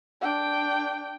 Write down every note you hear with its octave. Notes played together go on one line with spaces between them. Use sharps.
D4 G5